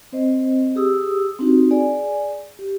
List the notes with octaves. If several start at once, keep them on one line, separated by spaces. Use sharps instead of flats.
C4 C5 D#5
G4 G#4 D#6 E6
C4 D4 D#4 F#4 G4
G#4 D5 G#5
G4